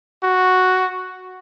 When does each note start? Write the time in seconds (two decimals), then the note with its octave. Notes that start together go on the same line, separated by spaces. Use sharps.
0.23 F#4